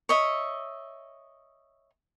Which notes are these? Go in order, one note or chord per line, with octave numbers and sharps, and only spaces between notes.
C#5 D#5 E5